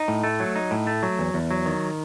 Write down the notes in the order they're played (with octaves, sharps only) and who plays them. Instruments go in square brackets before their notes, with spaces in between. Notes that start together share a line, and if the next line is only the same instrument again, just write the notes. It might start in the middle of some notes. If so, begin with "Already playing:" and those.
Already playing: [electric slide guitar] D#4
A2
A3
F#3
D#4
A2
A3
F#3
E2
E2
F#3
D#3